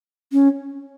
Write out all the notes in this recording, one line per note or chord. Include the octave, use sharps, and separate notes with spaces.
C#4